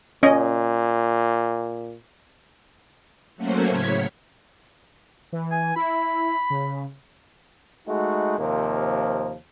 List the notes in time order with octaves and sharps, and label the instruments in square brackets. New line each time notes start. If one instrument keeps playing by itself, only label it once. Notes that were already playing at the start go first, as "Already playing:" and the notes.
[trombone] A#2 [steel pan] C#4 D#5
[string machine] F#3 A3 A#3 C#4 F#4 C5
A2 C#3 C#5 G#6 B6
[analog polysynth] E3
[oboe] G#5
[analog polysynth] E4 [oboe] B5
[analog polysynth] C#3
[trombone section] G#3 A3 D#4 F#4
D#2 C3 F3 A#3